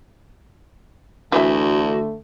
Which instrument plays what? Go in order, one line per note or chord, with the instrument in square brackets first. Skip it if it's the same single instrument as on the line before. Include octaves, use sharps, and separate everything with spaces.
[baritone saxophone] D2 [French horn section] D3 A3 [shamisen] E3 E5 [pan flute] F#4